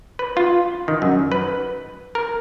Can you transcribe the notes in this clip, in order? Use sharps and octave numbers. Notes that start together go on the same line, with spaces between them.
B4
F4
D#3
F#2
B4
A#4